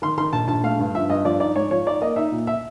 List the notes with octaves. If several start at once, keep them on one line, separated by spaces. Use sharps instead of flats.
D#3 C6
D#3 C6
A#1 A5
A#1 A5
A3 F5
G2
F3 E5
G2 D#5
F3 D5
D#4 D5
G#2 C#5
F3 C#5
D#4 D5
A#3 D#5
D#4 E5
A#2
E5